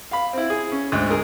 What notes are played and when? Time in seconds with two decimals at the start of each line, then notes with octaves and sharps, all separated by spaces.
0.11 F5 B5
0.33 C4 E4
0.50 G#4
0.72 C#4
0.92 D2 G#2
1.11 G#4 A#4